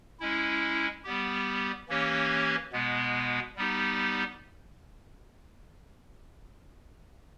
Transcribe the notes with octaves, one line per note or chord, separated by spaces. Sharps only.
G#3 C#4 E4
G3 B3 G4
E3 A#3 C#4 G4 C#5
B2 G#3 B3
G3 B3 D#4 G4